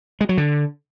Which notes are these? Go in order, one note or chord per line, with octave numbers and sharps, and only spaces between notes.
G#3
F#3
D3